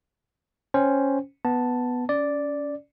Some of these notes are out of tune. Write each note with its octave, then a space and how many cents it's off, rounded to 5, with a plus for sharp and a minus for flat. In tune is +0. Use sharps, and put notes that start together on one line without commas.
C#4 +0 C5 +0 G5 +0
B3 +0 A5 +0
C#4 +25 D5 -5